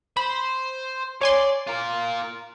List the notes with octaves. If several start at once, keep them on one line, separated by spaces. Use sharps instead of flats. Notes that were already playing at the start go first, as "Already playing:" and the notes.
C5 B5
C#5 D5 G#5 C6
F4 A#4